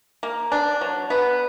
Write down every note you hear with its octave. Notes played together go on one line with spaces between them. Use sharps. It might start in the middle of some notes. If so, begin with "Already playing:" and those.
A#3
D4
F#3
B3